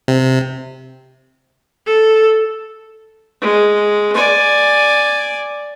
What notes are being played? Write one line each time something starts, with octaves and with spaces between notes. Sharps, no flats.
C3
A4
G#3
D5 G#5